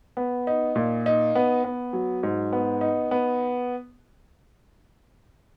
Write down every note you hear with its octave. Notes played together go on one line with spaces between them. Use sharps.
B3
D#4
A#2
D#4
B3
B3
F#3
G#2
B3
D#4
B3